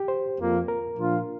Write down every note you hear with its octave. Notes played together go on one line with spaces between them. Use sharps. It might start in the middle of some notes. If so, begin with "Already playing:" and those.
Already playing: G4
C5
F2 F3 A#3
A#4
A#2 F3 D4 F4